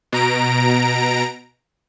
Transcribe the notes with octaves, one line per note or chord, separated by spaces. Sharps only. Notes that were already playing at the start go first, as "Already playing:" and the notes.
B2 A#5 D7